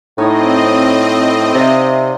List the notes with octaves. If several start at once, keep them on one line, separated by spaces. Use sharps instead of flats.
A2 C4 D#4 C#5 D#5 D#6
C3 D5 E5 F5